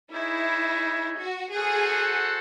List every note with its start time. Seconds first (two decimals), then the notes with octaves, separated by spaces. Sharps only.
0.13 D#4 E4 G#4 C#5 E5
1.19 F#4
1.55 F#4 G#4 A4 C5 F#5